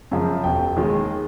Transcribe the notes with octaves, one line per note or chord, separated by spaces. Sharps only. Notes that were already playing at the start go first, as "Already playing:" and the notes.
F#2 C#3 F3
E1 G5
D#2 D#3 G#3